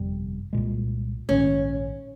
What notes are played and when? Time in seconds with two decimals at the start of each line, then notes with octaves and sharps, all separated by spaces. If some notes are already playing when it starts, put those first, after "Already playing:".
Already playing: G1 F2 C3 G3
0.53 C2 A#2 G#3
1.29 A#1 G#2 D#3 C#4